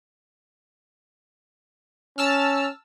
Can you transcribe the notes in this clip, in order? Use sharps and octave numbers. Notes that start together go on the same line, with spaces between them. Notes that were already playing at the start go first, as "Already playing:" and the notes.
C#4 A5 E6 F6